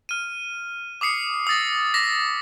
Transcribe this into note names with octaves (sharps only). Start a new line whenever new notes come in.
F6 D#7
D6 D#6 C7 C#7
D#6 E6 A6 A#6
D6 A#6 B6